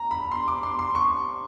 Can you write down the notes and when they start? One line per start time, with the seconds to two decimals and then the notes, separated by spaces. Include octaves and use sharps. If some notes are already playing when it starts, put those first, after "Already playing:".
Already playing: A#5
0.11 B5
0.32 C6
0.48 D6
0.63 C6
0.79 C6
0.95 C#6